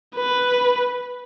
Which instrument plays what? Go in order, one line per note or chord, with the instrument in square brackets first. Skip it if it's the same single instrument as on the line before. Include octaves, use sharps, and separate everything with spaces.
[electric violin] B4